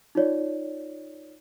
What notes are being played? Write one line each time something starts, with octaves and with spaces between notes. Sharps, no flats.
D#4 F4 C#5 D5